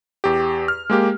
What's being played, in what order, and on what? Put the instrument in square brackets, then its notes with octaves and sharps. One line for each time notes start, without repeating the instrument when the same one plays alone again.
[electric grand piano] E2 G4
F6
G#3 A#3 G4